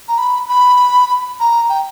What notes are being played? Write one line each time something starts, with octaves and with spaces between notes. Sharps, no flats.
A#5
B5
B5
A#5
G5